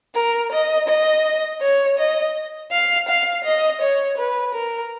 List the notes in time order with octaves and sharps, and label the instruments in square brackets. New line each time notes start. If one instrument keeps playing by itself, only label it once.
[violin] A#4
D#5
D#5
C#5
D#5
F5
F5
D#5
C#5
B4
A#4